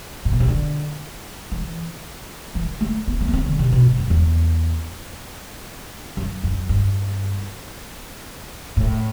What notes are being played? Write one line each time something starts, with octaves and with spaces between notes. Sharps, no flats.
A2
B2
C3
D3
E3
E3
A3
B3
A3
B3
C4
D3
C3
B2
A2
F#2
E2
F#2
F#2
G2
A2